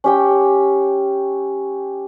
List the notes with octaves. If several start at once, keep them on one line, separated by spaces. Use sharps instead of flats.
C#4 G4 G5